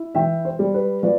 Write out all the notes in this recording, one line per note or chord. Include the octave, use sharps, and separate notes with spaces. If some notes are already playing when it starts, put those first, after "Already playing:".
Already playing: E4
E3 E5 G5
C5
G3
B4
F3 B4 D5